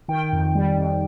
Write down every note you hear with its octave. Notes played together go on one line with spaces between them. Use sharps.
D#3 G5
F2
G3
F2